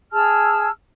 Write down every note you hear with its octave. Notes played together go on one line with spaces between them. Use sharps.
G#4 A5 E6 F6